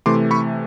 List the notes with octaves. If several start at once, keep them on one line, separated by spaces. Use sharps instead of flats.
C3 E3 A3 C6 D6
B5 C#6